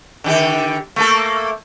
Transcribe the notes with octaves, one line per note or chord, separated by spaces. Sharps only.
D3 D#3 G4
A3 A#3 A4